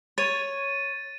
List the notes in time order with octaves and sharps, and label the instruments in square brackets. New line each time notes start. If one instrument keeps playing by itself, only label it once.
[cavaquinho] C#5 [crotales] A6 D#7